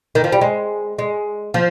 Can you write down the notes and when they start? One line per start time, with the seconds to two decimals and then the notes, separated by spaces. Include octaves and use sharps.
0.15 D#3
0.24 F3
0.32 G3
0.41 G#3
0.99 G#3
1.54 F3